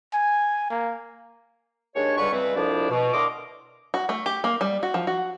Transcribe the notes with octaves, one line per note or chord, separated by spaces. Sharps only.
G#5
A#3
D#2 G#3 D4 C#5
C#2 D3 G3 B4 C#6
C#2 E3 G3 C4 B4
C2 F2 F3 D4 E4 D5
B2
A2 D3 A#4 D#5 C6 D6
F#4
A3
G4
A#3
G3
F#4
F3
F#4